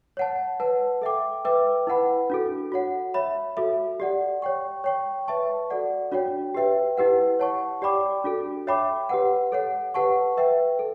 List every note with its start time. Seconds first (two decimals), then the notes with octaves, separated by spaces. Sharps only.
0.17 C#5 F#5 A5
0.60 B4 F#5 A5
1.02 A4 E5 G5 D6
1.45 B4 E5 G5 D6
1.87 E4 B4 F#5 B5
2.30 D4 F#4 A4
2.72 F#4 C#5 F#5
3.14 C#5 E5 B5
3.57 F#4 A4 E5
4.00 G4 D5 F#5
4.42 C#5 G5 C#6
4.84 C#5 G5 C#6
5.28 B4 E5 A5 C#6
5.70 F#4 A4 D5 F#5
6.12 D4 F#4 C#5 G5
6.54 G4 B4 E5 G5
6.97 E4 G4 B4 F#5
7.39 C#5 F#5 A5 C#6
7.82 G4 D5 G5 B5 D6
8.24 D4 F#4 A4
8.67 C#5 E5 G5 B5 D6
9.09 G4 B4 F#5
9.52 A4 C#5 F#5
9.94 G4 B4 F#5 A5 C#6
10.37 B4 E5 G5
10.79 A4